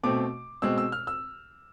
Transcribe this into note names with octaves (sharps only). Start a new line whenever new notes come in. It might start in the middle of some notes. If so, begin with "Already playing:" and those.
B2 A3 C4 D6
B2 G#3 C4 E6
E6
F6
E6